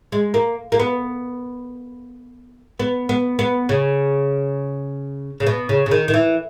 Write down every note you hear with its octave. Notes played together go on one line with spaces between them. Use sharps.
G#3
A#3
A#3
B3
B3
B3
B3
C#3
C#3
B2
C#3
C#3
D#3
D#3
E3